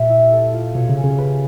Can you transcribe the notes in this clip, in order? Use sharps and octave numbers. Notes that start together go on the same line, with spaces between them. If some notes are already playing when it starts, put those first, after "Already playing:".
Already playing: A#2 G4 E5
E4
A4
F4
B2 C#5
C#3
C#4
C#3
B4